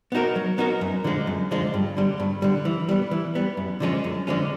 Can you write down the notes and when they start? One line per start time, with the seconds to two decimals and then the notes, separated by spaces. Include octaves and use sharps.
0.12 B3 D#4 F#4 A#4
0.36 F#3
0.58 B3 D#4 F#4 A#4
0.81 F#2
1.04 D3 F3 G#3
1.27 F#2
1.51 D3 F3 G#3
1.74 G2
1.97 D3 G3
2.20 G2
2.42 D3 G3
2.65 E3
2.89 G3 B3
3.11 E3
3.35 G3 B3
3.57 F#2
3.80 D3 F3 G#3 C#4
4.04 F#2
4.27 D3 F3 G#3 C#4